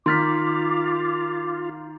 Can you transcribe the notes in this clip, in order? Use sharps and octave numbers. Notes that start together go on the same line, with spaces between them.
D#3 F4 C6 D6 F6 A6 B6